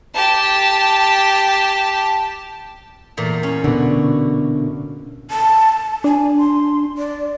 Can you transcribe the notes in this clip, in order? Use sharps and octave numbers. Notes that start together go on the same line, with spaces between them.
G4 A5
E2 A#2 A3
C#4
B2 D3 F#4
A5
D4 G#5
C6
D5